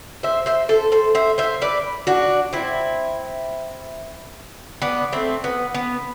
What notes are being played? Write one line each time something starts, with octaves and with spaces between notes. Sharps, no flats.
C5 E5
C5 E5
A4 C5
A4 C5
C5 E5
C5 E5
B4 D5
D4 F#4
C4 E4
B3 D4
A3 C4
B3
B3